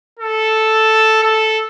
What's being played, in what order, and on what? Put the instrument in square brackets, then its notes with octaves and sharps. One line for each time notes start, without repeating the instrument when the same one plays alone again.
[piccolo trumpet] A4
A4